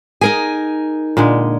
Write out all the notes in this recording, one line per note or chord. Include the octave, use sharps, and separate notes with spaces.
D#4 G#4 A#4 G#5
A#2 D3 G#3